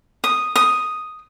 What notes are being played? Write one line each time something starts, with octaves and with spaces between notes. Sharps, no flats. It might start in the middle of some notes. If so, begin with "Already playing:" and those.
D#6
D#6